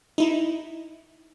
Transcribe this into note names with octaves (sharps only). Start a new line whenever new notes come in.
D#4 E4